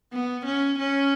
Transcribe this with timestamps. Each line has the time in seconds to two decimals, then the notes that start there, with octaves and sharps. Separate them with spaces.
0.13 B3
0.45 C#4
0.79 C#4